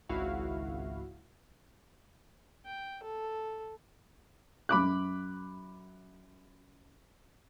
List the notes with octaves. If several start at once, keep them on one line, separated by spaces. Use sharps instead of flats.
G#1 C#2 E4 F#4 F5
G5
A4
F#2 B5 D6 F#6